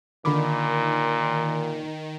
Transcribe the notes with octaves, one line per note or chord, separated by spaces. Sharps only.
A#2 D3 D#3 B5 D6